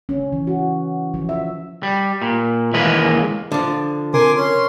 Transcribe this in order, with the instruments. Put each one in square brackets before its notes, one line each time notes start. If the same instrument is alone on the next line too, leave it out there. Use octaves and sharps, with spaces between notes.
[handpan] C#4
E3
F#4
F3
E5
[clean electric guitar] G3
A#2
D#2 E3 G#3 A#3 B4
[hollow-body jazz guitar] D3 F3
[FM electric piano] C3 A#4 [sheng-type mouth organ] G#5 C6 D6
[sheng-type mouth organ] C#4 C6